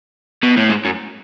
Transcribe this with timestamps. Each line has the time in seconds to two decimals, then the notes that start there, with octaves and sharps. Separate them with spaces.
0.43 B2
0.57 A2
0.69 G#2
0.85 F#2